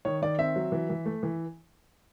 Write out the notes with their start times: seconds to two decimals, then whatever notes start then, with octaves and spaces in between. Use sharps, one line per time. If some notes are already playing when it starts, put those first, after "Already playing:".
0.05 D#3 C#5
0.22 D#3 D5
0.38 C4 E5
0.56 F#3
0.72 E3
0.90 E3
1.06 A3
1.23 E3